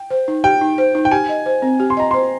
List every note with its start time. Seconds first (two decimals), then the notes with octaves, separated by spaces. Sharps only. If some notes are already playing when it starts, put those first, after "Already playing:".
Already playing: G5
0.10 C5
0.28 D#4
0.44 G4 G5
0.61 D#4
0.78 C5
0.95 D#4
1.05 G5
1.11 G4 G#5
1.29 D#5
1.46 C5
1.62 C4
1.80 G4
1.90 C6
1.97 D#5 A#5
2.11 C5 C6